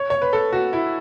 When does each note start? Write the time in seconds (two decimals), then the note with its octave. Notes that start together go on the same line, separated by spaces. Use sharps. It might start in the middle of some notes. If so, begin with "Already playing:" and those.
Already playing: C#5
0.10 C#5
0.22 B4
0.33 A4
0.53 F#4
0.73 E4